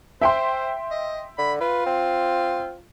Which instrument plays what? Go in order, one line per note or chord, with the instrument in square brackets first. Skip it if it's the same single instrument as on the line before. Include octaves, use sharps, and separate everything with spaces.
[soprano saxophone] C5 [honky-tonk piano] E5 G5 C6
[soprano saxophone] D#5
[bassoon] D3 [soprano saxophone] B5
[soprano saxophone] F4 [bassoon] B4
[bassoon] C4